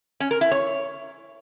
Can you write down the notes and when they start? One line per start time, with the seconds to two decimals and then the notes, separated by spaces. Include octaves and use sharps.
0.20 C#4
0.31 A#4
0.41 E4
0.51 C#5